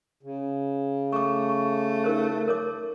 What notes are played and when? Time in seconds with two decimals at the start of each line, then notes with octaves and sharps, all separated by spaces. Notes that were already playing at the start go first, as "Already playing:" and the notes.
0.23 C#3
1.13 A3 C#6 D6
1.49 C#6
2.04 D#4 A#4 C5
2.48 A#4 C#5 D6